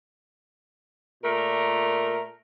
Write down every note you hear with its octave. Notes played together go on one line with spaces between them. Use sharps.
A#2 A3 A#4